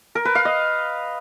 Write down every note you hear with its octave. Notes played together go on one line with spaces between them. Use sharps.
A#4
B4
F5
D#5